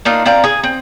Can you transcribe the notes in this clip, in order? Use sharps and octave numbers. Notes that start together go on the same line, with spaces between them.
A#3 D4 D#4 F4
C4 D5 F5 A#5
G#4
C4